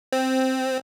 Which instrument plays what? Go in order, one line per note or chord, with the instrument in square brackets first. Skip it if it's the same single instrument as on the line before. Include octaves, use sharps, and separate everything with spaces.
[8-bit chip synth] C4